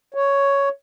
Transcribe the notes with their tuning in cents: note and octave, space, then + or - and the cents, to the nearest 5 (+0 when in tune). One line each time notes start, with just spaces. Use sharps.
C#5 +5